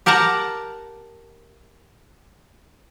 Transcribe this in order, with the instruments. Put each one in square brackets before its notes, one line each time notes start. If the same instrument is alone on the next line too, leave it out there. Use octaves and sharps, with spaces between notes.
[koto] G4 A#4 F#5 A5 A#5